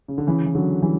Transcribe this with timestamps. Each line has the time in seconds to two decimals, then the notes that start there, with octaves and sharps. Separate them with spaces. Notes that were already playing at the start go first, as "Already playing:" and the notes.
0.08 C#3
0.18 D3
0.27 C#3 E3
0.46 E3
0.55 D3 F#3
0.82 E3 G3